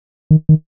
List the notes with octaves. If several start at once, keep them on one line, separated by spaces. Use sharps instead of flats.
D#3
D#3